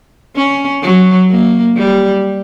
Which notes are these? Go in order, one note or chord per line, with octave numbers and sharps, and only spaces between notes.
C#4
F#3
A#3
G3